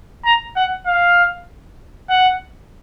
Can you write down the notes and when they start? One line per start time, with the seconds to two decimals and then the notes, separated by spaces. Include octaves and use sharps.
0.25 A#5
0.56 F#5
0.86 F5
2.10 F#5